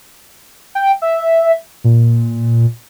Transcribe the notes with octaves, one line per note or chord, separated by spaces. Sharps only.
G5
E5
A#2